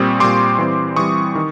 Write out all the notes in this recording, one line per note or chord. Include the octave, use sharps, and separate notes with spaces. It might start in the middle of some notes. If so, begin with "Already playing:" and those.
Already playing: A#2 G3 C4 C#6 D#6
A#2 G3 C4 C6 D6
E3 G3 C4
E3 G3 C4 C#6 D#6
D#3